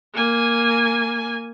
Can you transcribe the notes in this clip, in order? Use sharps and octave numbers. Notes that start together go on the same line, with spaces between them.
A#3 G#5